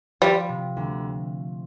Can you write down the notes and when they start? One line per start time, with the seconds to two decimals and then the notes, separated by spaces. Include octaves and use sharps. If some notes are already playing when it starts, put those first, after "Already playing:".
0.21 F3 G3
0.49 C3
0.77 D2